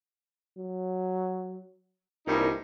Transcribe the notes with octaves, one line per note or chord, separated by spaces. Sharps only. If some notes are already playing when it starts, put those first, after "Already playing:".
F#3
C2 G2 A#2 D#4